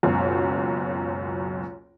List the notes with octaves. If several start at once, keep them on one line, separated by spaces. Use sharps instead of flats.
F#1 C#2 F#2 B2